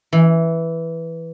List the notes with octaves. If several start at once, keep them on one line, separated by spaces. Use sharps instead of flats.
E3